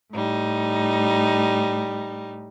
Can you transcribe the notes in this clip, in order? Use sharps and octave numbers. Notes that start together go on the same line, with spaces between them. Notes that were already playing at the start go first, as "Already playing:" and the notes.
A2 G3 D#4